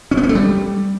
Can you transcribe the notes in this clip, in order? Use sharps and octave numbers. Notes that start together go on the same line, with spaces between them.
C#4
B3
C#4
A3
G3